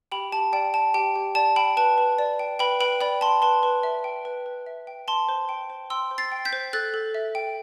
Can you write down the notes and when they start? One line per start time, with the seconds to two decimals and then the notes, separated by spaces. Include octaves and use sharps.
0.12 G4 G5 B5
0.32 G4 A5
0.53 D5 G5
0.74 G5 A5
0.94 G4 G5
1.16 G4
1.35 D5 A5
1.56 G5 B5
1.77 B4 A5
1.98 B4
2.19 D5
2.39 G5
2.59 B4 G5 B5
2.80 B4 G5 B5
3.01 D5 G5 B5
3.21 G5 A5 C6
3.42 B4 A5 C6
3.63 B4
3.83 E5
4.04 G5
4.25 B4
4.46 B4
4.66 E5
4.87 G5
5.08 G5 A5 C6
5.29 C5
5.49 G5
5.70 C5
5.90 G5 C6 E6
6.11 C5
6.18 A6 C7
6.32 G5
6.45 G6 B6
6.53 C5
6.73 A4 F#6 A6
6.94 A4
7.15 E5
7.35 G5